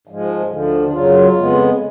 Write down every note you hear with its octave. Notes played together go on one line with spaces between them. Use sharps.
G#2 F3 G#3
D2 D3 F3
D4
F#2 C#3 F#3 F4
F2 C#3 G#3 B3